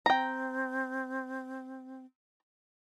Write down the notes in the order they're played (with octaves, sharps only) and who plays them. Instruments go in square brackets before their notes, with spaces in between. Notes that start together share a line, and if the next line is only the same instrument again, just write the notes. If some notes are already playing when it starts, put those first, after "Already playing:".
[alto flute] C4 [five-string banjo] G5 A#5